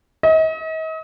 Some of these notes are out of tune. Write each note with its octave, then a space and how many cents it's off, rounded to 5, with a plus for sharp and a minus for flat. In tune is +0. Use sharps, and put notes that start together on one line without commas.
D#5 +40